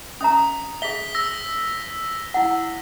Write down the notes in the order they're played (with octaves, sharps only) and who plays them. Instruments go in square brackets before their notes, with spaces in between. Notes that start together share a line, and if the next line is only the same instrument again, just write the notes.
[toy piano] C#4 E5 A#5 [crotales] D#6
[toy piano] G#4 E5 [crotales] B6 G7
[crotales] E6 A#6
[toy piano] E4 F#5